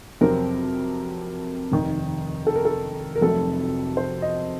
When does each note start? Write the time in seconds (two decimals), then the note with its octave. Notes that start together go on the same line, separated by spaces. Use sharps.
0.21 F2 C3 F#3 C4 A#4
1.72 F1 D#2 D#3
2.47 A4
2.56 A#4
2.65 A4
3.15 A#4
3.21 F1 F2 C3 F#3 A3 A4
3.97 C5
4.22 D#5